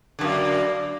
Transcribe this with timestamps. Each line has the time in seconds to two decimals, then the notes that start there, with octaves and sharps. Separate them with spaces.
0.19 D3
0.21 F#2
0.24 A#3